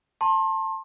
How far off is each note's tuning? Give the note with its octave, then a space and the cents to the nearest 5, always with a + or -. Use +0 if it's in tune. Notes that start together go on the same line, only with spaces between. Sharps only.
A5 +15 C6 +35